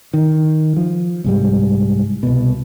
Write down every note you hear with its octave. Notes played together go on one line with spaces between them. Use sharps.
D#3
F3
C2 G#2 G3
C2 B2